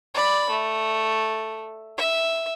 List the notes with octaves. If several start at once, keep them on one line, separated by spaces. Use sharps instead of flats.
D5 B5
A3
E5